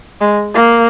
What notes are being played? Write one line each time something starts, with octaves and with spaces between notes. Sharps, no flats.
G#3
A#3